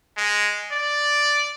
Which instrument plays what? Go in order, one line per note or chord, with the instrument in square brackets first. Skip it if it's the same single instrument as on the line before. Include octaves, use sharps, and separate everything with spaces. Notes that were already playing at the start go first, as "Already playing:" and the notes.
[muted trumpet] G#3
D5